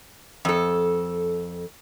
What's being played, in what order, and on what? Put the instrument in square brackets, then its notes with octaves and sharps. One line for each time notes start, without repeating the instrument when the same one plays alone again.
[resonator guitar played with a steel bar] F2 A4